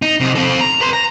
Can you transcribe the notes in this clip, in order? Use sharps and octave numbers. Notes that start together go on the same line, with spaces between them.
D#4
C3 D#4
C4 A4
A#5
B4 C6
A#5